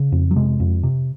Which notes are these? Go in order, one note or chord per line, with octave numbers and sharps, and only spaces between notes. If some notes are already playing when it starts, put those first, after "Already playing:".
Already playing: C#3
F2
F#3
C3 G#3
F2
C3